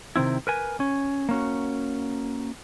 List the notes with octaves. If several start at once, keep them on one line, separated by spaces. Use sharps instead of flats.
C3 D#3 C4 E4
A#4 B4 G#5
C#4
A#3 C#4 F#4